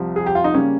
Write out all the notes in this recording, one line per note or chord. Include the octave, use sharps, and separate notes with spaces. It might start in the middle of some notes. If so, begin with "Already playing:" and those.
Already playing: C2 C3 F3
G#4
G4
F4
D#4
C#3 G3 A#3 C#4